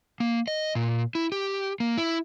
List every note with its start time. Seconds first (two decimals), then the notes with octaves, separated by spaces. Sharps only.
0.20 A#3
0.48 D#5
0.75 A#2
1.15 E4
1.32 G4
1.80 A#3
1.98 E4